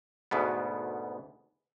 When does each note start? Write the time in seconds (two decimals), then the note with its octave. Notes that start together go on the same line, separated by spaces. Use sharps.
0.31 D2 G#2 B2 B3